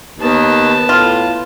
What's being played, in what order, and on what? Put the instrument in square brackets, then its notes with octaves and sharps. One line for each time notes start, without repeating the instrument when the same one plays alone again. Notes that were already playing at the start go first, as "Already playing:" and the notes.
[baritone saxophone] D#2 [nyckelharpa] B3 A5
[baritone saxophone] A2 [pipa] F4